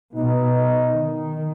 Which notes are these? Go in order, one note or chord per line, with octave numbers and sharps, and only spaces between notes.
B2 D#4
D#3